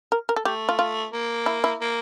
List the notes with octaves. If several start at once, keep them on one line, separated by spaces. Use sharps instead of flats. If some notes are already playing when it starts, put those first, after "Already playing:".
A#4
A#4
A4
A3 G4
F4
F4
A#3
E4
E4
A#3